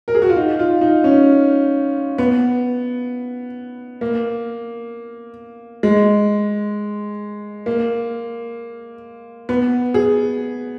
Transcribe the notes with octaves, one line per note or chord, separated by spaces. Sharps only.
A#4
G#4
F#4
F4
D#4
F4
D#4
C#4
B3
A#3
G#3
A#3
B3
G#4